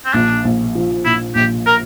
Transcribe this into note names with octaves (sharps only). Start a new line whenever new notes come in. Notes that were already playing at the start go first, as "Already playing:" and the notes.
C4
A#1 D4
A#1
F3
A#2 E4
A#1 G4
A#4